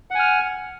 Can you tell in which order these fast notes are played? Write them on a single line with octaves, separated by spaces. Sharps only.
F#5 G#5 F6